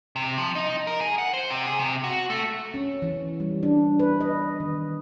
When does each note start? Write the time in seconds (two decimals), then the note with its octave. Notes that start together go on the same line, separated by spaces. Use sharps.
0.16 C3
0.38 F3
0.55 D#4
0.87 A#4
1.01 G#4
1.18 F#5
1.33 C5
1.50 C3
1.66 G#4
1.79 C3
2.04 F#4
2.30 A3
2.74 C#4
3.02 E3
3.40 G3
3.63 D4
3.99 B4
4.21 D#5
4.60 D#3